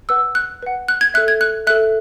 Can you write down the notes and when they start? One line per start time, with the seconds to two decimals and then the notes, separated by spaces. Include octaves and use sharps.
0.09 B4 F#5 E6
0.35 F#6
0.63 B4 F#5
0.88 F#6
1.01 G#6
1.14 A4 E5 F#6
1.28 G#6
1.41 F#6
1.67 A4 E5 F#6